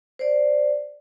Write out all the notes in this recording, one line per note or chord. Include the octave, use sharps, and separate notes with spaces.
C5 D5